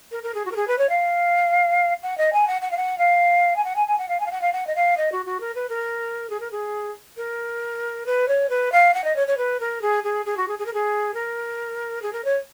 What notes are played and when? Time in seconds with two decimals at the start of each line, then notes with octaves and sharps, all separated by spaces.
0.12 A#4
0.23 A#4
0.34 G#4
0.45 F#4
0.52 A#4
0.56 G#4
0.67 B4
0.78 C#5
0.89 F5
2.03 F#5
2.18 D#5
2.33 G#5
2.47 F#5
2.62 F#5
2.71 F5
2.77 F#5
2.98 F5
3.56 G#5
3.64 F#5
3.76 G#5
3.87 G#5
3.98 F#5
4.09 F5
4.20 G#5
4.26 F5
4.31 F#5
4.41 F5
4.53 F#5
4.67 D#5
4.76 F5
4.97 D#5
5.12 F#4
5.26 F#4
5.41 A#4
5.55 B4
5.69 A#4
6.30 G#4
6.40 A#4
6.52 G#4
7.17 A#4
8.06 B4
8.28 C#5
8.49 B4
8.72 F5
8.94 F#5
9.04 D#5
9.16 C#5
9.27 C#5
9.37 B4
9.60 A#4
9.82 G#4
10.04 G#4
10.26 G#4
10.37 F#4
10.48 G#4
10.59 G#4
10.66 A#4
10.74 G#4
11.14 A#4
12.02 G#4
12.13 A#4
12.25 C#5